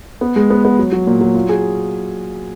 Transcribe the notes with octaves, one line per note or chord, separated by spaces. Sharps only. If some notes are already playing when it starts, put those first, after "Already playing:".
B3
G#3
B3
B3
F#3
F#3
A#2
F#3
F4
G#4